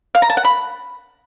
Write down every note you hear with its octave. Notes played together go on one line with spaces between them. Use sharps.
F5
A#5
A5
F#5
B5